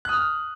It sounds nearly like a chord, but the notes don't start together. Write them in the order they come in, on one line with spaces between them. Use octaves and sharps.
F#6 D#6 F6